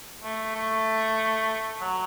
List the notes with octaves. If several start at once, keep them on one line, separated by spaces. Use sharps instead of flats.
A3
A3
F#3